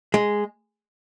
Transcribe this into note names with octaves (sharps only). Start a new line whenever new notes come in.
G#3